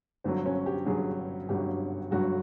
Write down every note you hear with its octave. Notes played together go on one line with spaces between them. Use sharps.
G1 G2 D3 F#3 C4
C#4
G4
G1 G2 D3 F#3 G#4
G1 G2 D3 F#3 G4
G1 G2 D3 F#3 F#4